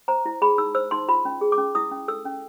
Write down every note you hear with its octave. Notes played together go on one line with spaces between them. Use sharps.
C5 A#5
E4
G#4 B5
D#4 E6
C5 E6
D#4 C6
F4 B5
C#4
G#4
D6
C#4
E4 D#6
C#4
A4 E6
C#4